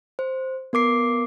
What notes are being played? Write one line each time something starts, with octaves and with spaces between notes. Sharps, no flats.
C5
B3 A#4 D6 C7